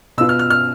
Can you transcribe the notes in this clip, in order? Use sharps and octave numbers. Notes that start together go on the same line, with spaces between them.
B2 B3 F4 B4 E6
F6
F6
F6